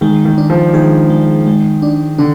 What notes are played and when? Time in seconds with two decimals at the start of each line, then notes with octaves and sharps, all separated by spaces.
0.01 D#3 G#3
0.25 D#3
0.38 D4
0.50 F3
0.73 D#3 G#4
1.10 G#3
1.47 G#3
1.82 D4
2.18 D3 D4